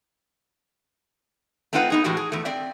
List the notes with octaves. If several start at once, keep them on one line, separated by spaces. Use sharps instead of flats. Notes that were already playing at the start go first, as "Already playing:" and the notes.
A3 C4 D#4 F4 B4 F#5
B3 D#4 G#4
A2 E3 G#3 F#4 G4
G#4
E2 A3
C4 D5 E5